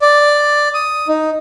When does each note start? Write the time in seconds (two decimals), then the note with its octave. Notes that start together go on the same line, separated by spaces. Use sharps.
0.02 D5
0.74 D#6
1.08 D#4